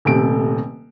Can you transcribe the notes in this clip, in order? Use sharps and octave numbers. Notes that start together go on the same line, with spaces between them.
D#1 C3 A3 D7